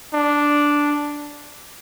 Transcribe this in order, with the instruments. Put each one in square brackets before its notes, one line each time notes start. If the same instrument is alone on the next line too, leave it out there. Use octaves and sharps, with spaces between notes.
[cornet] D4